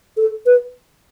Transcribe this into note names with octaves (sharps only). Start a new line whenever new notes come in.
A4
B4